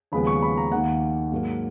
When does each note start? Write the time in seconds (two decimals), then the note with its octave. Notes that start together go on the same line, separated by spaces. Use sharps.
0.12 D#2 C#3 F3 G#3 B3 B5
0.27 C#6
0.42 B5
0.58 A#5
0.72 D#2 D#3 A#3 F#5
1.32 G#2 F#3 A#3